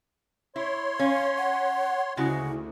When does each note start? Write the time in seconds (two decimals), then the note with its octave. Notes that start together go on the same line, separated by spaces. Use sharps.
0.56 E4 C#5 C6
1.00 C#4 F5
1.38 F#5
2.17 D2 C#3 G#3 E4 F#4